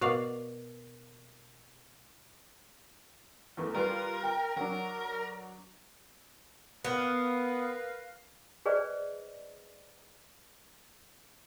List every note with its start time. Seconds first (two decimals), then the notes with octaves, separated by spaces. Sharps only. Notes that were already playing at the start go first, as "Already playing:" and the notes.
0.01 B2 F#4 A#4 D5 F5
3.57 E2 A3 A#4
3.75 G3 F4 A#4 B4
4.23 G5
4.57 F#3 D4 A#4
6.84 B3 A#4 B4 F5
8.66 G#4 B4 C5 D5 D#5